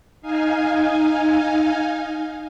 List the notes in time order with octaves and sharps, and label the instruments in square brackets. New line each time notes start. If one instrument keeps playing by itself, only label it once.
[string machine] D#4 F5 G#5